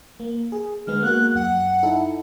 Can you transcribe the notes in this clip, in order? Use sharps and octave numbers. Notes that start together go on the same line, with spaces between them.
A#3
G#4
D3 G#3 B3 F6
A#3 F#4 F#6
F#2 F#5
D#4 E4 A4